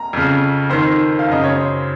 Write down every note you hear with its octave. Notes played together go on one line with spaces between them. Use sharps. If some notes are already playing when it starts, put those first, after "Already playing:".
Already playing: A#5
F2 C#3
F2 D#3 C5
F5
F#2 C#3 D#5
C#5
C5